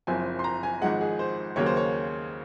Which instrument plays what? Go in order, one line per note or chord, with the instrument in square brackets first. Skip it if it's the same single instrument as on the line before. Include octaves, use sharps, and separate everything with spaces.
[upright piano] F#1 F#2 F3 C4 G#5
C6
A#5
G#5
G#1 G#2 F3 G#3 F#5
G#4
C5
D#2 C#3 F#3 A#3 C#5
C5
C#5